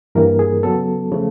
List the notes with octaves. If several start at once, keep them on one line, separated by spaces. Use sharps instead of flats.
G2 E3 G3 A#3 A#4
G#4
C#3 F#3 B3 A4
C#3 F3 A3